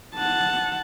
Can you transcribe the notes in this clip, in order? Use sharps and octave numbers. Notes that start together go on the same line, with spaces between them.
F#5 A5